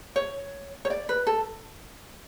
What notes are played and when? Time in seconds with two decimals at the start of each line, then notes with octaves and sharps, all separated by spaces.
0.16 C#5
0.85 C#5
0.90 D5
1.09 B4
1.27 A4